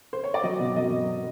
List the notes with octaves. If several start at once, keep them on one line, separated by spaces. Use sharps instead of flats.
C5
C#5
D5
F#3 D#5
B2
F#3 D#5